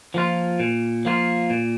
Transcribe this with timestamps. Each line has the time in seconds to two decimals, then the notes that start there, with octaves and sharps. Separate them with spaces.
0.14 F3 A#3 F4
0.60 A#2
1.05 F3 A#3 F4
1.50 A#2